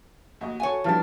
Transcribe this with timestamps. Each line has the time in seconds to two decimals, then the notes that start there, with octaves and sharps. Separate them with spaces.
0.41 D#2 F#4 D#5
0.60 F#4 A4 C#5 G#5
0.84 E3 F3 G3 B3 D4 A5 F6 A6